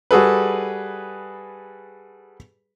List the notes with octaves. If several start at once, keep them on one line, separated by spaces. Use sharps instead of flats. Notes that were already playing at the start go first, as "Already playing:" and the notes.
G3 F#4 G#4 A4 B4